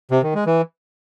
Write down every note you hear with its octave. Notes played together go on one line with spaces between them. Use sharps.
C3
D#3
G#3
E3